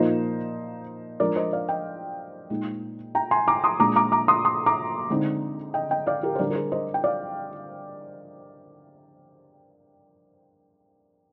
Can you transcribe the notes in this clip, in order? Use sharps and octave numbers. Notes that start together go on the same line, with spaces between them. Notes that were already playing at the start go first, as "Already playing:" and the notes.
Already playing: A#2 F3 A#3 D#4 C5 D#5
F3 G#3 D4 A#4 D5
C5 D#5
D5 F5
D#5 G5
A#2 G#3 D#4
G5 A#5
G#5 C6
A#5 D6
C6 D#6
A#2 G#3 D4 A#5 D6
A#5 D6
A#5 D6
C6 D#6
C6 D#6
A#5 D6
D3 G#3 C4 D#4
D#5 G5
D#5 G5
D5 F5
G4 A#4
C5
D3 G3 D4 A#4 D5
A#4
G#4 C5
C5 D#5
G5
D5 F5